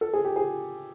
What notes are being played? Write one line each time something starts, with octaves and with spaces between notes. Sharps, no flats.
A4
G#4
G4
G#4